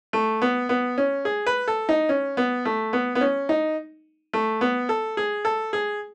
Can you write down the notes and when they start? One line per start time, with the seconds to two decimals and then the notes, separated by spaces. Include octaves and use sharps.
0.13 A3
0.42 B3
0.69 B3
0.98 C#4
1.25 G#4
1.47 B4
1.68 A4
1.89 D#4
2.09 C#4
2.37 B3
2.65 A3
2.93 B3
3.15 B3
3.21 C#4
3.49 D#4
4.33 A3
4.61 B3
4.89 A4
5.17 G#4
5.45 A4
5.73 G#4